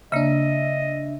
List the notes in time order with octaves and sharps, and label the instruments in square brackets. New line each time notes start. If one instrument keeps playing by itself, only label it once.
[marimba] C#3 A#3 [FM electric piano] D4 E5 [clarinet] D#5